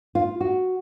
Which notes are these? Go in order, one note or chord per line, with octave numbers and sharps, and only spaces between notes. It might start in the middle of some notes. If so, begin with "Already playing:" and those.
F4
F#4